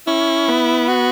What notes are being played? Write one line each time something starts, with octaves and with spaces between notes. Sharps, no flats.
C#4 E4
B3
F#4